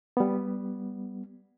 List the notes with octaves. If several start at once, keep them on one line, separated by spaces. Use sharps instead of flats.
G3 B3